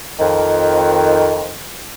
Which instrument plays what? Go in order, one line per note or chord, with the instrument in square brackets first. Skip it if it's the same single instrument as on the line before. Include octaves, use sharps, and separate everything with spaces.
[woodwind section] F2 D#3